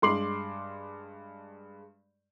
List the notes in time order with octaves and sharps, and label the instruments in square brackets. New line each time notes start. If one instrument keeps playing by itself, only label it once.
[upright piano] G2 G#3 C6 D6 C7 F#7